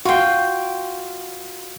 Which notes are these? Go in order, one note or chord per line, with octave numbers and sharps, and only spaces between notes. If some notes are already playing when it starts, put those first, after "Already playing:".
F4 F#4 G5 C6